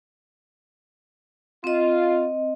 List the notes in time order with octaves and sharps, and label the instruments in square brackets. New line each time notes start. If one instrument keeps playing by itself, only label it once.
[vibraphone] C4 D#5 [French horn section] F4